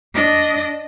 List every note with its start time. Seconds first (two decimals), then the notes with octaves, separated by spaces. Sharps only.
0.14 D4 D#5